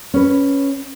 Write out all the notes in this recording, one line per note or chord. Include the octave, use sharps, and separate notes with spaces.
C#4 B4